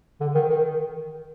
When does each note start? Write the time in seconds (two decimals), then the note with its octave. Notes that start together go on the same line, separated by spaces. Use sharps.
0.20 D3
0.35 D#3
0.50 D#3